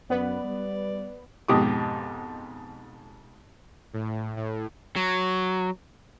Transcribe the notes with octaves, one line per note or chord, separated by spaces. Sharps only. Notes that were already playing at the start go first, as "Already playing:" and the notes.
F#2 B3 B4 D5
G3
F2 G#2 B2 G4 D6 D#6
A2
A2
F#3